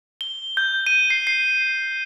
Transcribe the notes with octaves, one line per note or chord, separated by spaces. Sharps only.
G7
G6
D#7
C7
C7